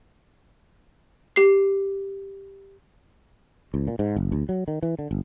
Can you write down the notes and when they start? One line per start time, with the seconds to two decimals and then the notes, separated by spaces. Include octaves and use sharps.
1.36 G4 C7
3.74 C#2
3.87 A#2
3.99 G#2
4.16 F#1
4.32 D2
4.49 F#3
4.68 D#3
4.83 E3
4.99 D3
5.11 G1